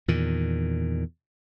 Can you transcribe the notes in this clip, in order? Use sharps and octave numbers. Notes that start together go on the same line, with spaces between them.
E2 A#2 D#3